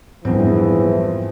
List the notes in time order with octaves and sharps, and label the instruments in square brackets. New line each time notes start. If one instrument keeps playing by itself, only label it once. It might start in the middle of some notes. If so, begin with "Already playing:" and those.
[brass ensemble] A#1 E3 [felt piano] F2 B3 C4 [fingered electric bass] G#2 F#3 G3